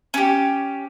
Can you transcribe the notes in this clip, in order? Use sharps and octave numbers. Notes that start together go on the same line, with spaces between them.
C#4 G4